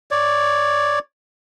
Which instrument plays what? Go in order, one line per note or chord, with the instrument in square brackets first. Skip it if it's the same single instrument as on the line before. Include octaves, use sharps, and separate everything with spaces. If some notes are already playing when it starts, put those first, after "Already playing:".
[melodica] C#5 D5